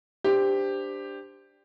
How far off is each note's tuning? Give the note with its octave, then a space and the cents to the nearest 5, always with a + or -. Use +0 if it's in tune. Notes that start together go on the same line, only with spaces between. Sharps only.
D4 +0 G4 +10 C5 -15